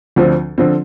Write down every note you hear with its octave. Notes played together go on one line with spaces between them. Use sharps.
D2 D3 F3 C4
D3 F3 C4